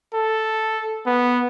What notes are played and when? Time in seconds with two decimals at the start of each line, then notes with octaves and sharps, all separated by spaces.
0.14 A4
1.06 B3